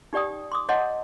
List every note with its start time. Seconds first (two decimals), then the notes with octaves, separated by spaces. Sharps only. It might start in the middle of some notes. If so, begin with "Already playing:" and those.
0.13 D#4 G4 D5 G5 D#6
0.52 C6 D6 D#6
0.69 C#5 D#5 F#5 A5 C6